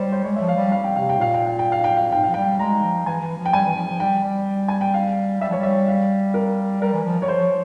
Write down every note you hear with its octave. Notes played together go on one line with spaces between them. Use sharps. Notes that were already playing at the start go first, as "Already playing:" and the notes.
Already playing: G3 C5 C#5
C5
G#3 C#5
F3 E5
F5
G3
F5
G5
C3 F5
G5
A#2 F5
G5
F5
G5
F5
G5
F5
G#2 G5
F3 F5
G3 G5
G#3 A#5
F3
E3 G#5
E3
F3
G5
G3 G#5
E3
F3
F3
G3 G5
G3
G#5
G5
F5
G3 E5
F3 C#5
G3
E5
F5
A#4
G3 A#4
E3
F3
G3 C#5
F3 C5